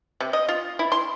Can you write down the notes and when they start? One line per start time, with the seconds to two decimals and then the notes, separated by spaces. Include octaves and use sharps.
0.20 C3
0.33 D#5
0.48 F4
0.79 E4
0.92 C6